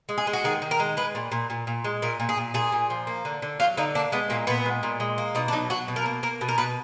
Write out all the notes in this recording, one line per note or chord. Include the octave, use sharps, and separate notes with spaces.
G#3
G#4
G#3
F#4
D#3 G#4
D#3
A#4
G#3
G#3 B4
A#2
A#2
A#2
A#2
G#3
A#2 A#4
A#2
G#4
A#2
A#2 G#4
A#2
F3
A#3
D3
D3
F#3 F4
D3 D#4
A#3 D4
G#3 B3
A#2 A#3
A#2 B3
G#3
A#2
G#3
A#3
B2 D#4
D4
F#3 D#4
F#3 F#4
B2
A#4
A#3
A#3 A#4
B2
A#4
B2 B4